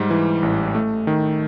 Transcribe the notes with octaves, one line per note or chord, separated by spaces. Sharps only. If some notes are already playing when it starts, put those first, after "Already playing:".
Already playing: G#2 G3
E3
A1
A3
D#3